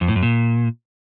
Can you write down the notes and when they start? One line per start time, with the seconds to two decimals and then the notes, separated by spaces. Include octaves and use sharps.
0.01 F2
0.08 A2
0.15 F#2
0.23 A#2